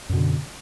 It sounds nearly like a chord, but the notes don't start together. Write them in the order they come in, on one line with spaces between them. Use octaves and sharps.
F#2 B2 D3